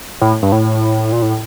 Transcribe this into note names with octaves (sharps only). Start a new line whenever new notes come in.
A2
G2
A2
A#2
A2